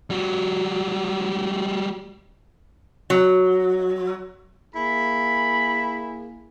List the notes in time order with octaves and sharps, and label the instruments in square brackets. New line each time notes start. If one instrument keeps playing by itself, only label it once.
[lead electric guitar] G3 F#4
[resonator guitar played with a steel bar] F#3
[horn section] A#3 E4 G#4 [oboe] B5